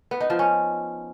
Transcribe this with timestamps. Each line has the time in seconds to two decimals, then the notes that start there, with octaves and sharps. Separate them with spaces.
0.11 B3
0.21 D#4
0.30 F3
0.39 C#4